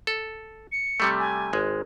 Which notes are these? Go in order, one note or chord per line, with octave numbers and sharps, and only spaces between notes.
A4
C#7
C3 G3 A3
G#5
G#1 G#3